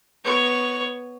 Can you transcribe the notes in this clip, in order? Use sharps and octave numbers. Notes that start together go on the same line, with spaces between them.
B3 C#5